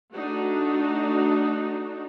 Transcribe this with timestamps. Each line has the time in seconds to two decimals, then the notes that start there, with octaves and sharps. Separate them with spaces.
0.14 A3 D4 D#4 F#4